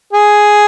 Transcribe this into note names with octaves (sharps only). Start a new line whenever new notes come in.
G#4